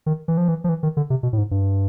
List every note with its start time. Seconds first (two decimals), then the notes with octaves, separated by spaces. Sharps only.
0.06 D#3
0.28 E3
0.38 F3
0.48 E3
0.64 F3
0.69 E3
0.83 D#3
0.97 D3
1.10 C3
1.23 B2
1.33 A2
1.38 G#2
1.51 G2